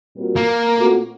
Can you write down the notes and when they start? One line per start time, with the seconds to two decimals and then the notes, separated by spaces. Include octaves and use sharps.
0.16 A#2 G3 C4 F#4 A#4
0.36 A#3
0.76 A#2 A3 C4 F#4